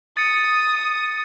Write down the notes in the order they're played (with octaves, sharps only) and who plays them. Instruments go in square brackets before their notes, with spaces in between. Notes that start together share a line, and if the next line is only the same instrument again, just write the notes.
[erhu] D#6 [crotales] A6 C#7